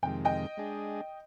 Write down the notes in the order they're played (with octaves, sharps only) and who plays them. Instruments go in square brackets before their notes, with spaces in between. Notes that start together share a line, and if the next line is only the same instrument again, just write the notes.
[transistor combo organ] F2 C3 D#3 G#3 [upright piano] G5
[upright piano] D#5 G5
[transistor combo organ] G#3 D4 G#4